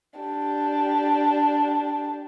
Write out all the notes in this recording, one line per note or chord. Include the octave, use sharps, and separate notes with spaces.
D4 G4